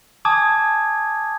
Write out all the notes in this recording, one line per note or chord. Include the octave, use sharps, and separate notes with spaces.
G#5 A5 D6 D#6 G#6